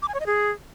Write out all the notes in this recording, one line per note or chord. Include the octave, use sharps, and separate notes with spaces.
D6
G#5
C#5
D#5
G#4